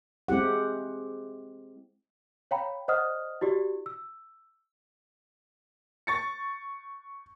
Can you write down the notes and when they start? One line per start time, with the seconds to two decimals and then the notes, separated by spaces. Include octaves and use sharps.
0.28 G#3 C4 E4 G4 F#5
2.51 C#5 F5 G5 A#5 B5
2.88 C5 D5 D#5 F#5 D#6 F6
3.41 E4 F#4 G4 D5
3.86 E6
6.07 C#6 A6 C#7